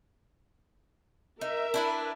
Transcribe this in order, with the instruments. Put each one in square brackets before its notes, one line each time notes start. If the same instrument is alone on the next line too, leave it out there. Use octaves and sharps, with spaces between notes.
[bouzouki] D#4 [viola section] A#4 E5
[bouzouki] D4 E4 B4